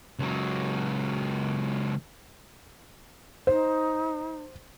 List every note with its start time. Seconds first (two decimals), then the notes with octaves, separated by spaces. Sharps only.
0.19 C#2 F#3
3.47 D#4 C5